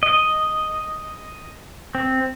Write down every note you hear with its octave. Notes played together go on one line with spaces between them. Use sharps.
D#5
C4